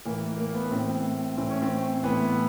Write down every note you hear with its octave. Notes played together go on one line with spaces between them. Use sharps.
A2 E3 A#3
A#3
A#3
B3
A2 E3 C4
A2 E3 C4
C#4
C4
A2 E3 B3